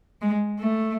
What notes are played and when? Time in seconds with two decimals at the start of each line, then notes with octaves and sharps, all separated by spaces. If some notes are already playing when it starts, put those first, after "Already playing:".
0.22 G#3
0.60 A3